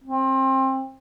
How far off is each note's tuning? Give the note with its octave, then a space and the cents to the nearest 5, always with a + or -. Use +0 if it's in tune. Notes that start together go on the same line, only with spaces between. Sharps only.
C4 +25